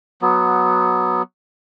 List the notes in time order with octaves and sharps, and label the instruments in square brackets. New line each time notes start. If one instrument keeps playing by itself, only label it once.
[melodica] F#3 B3